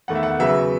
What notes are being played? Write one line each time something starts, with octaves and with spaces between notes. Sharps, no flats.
E2 D#3 A3 F#5
E5
F#5
E2 C#3 F#3 B3 E5